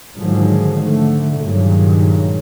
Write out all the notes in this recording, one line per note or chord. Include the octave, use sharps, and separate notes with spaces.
G#2 D3 D#3 F3 F#3 G#3
D3 A3
G2 A#2 D#3 F#3 G#3